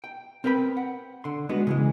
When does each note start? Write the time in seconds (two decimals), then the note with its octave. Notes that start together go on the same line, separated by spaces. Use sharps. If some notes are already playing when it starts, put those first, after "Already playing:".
0.04 G5
0.44 C4 A#4 B4 G5 B5
0.77 F#5
1.24 D3 C6
1.49 G#3 B3 D4 F#4
1.67 C#3 E3 G#3